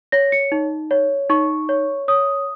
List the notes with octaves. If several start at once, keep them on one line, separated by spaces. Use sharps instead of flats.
C#5 A#6
C#7
D#4
C#5
D#4 C#6
C#5
C#5 D#6